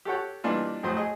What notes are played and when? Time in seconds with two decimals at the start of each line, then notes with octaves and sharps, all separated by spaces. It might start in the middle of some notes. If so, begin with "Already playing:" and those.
0.05 G4 A4 C#5 F#5 G5
0.44 A#2 E3 G3 D4 D#4 F4
0.83 F2 A2 F#3 C5 D#6
0.97 G#4 D#5